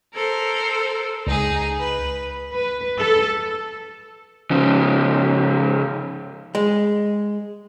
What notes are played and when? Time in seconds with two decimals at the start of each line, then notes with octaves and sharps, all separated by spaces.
0.14 A4 A#4 C5
1.27 C#2 D#4 G#4
1.77 B4
2.53 B4
3.00 A4
4.51 C#3 F3
6.55 G#3